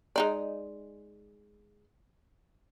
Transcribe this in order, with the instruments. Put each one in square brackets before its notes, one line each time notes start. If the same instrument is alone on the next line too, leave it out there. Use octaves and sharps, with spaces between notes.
[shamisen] G#3 D#4 D5